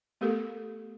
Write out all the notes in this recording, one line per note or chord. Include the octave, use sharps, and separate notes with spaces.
A3 B3 G4 A4 A#4